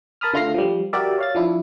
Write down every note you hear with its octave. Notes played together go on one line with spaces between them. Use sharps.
A#4 A5 B5 D#6 F6
D3 A3 F4 F6 A#6 C7
F3 G3
F#4 G4 A#4 D5 E5
C#5 F5 A6
F3 D4 E4